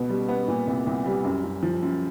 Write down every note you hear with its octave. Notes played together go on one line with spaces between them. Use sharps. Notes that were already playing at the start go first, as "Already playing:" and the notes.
Already playing: C#2 B2 B3
G3
B3
A#2
C2
C2
G3
F#2
F#2
F3
F#2